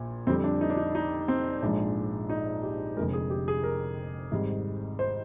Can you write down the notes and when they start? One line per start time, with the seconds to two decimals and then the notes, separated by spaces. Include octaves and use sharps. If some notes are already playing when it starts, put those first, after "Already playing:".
Already playing: A#1 A#2
0.27 F2 D3 G3 C4
0.44 D4
0.61 D#4
0.70 D4
0.77 D#4
0.95 D#4
1.28 C4
1.62 A#1 G#2 F3 G#3 D4
2.29 D#4
2.63 G4
2.96 F1 F2 D3 G#3 A#4
3.13 G#4
3.30 G4
3.48 G#4
3.64 A#4
4.31 G#1 G#2 G3
4.99 C5